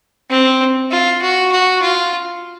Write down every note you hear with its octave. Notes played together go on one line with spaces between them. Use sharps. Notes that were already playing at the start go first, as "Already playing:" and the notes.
C4
F4
F#4
F#4
F4